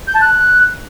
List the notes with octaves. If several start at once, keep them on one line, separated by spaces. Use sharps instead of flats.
G6
A5
F#6